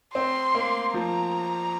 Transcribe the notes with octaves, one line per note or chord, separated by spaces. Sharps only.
C4 C6
A#3
F3 A#5